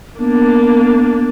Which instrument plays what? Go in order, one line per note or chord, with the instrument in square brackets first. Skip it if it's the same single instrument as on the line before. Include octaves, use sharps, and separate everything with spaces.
[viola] A#3 D4 [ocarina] B3